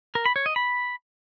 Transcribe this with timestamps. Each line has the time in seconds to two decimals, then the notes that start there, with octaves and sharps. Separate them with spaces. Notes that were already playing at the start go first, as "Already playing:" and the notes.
0.15 A#4
0.26 B5
0.36 C#5
0.46 D#5
0.56 B5